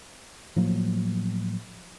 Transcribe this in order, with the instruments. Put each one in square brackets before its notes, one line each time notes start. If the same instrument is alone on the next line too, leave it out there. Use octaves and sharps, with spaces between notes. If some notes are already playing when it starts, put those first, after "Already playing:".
[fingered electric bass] A2 F3 F#3 A#3